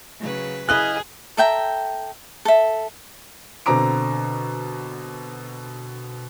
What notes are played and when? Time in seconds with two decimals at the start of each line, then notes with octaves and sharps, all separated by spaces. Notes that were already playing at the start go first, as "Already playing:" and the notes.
0.20 C#3 F#3 B4
0.69 E4 G#4 D#5 F5 F#6
1.37 A4 E5 G5 A#5
2.45 A4 E5
3.66 B2 D3 C4 A#5 D6 D7